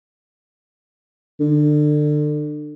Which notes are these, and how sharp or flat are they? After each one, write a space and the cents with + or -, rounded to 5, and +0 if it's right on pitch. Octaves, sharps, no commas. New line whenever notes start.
D3 +30